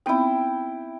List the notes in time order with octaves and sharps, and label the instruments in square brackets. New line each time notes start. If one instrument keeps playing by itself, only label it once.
[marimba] B3 C4 D#4 [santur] E4 G5